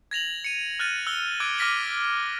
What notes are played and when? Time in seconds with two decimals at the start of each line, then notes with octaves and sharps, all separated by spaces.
0.11 G#6 A#6 F7 F#7
0.44 C#7 D#7
0.79 F6 F#6 A6 D#7
1.07 E6 F#6 G7
1.40 D6 E6 F#6 G#6 D7
1.58 D6 F6 A#6 B6 D#7 G7